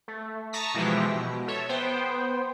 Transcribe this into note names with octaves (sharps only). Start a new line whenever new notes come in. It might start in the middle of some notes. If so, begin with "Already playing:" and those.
A3
A5 A#5 C#6 D#6 A#6 B6
B2 E3 F3 G#3 E4 G4
B2
A4 C#5 E5
B3 C5 G5